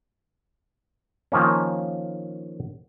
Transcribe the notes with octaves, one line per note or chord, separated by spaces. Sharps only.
D#3 F3 A#3 C#4